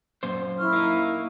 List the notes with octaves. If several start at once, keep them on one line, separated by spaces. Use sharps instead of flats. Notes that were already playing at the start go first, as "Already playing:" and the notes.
F#2 A#2 C5
E4 C#6 F6
A#3 D#4